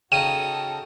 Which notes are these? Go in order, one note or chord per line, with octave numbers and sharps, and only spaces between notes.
C#3 D#4 F#4 A4 G5 D#7